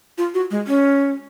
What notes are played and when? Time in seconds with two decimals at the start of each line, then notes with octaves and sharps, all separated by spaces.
0.18 F4
0.34 F#4
0.51 G#3
0.67 C#4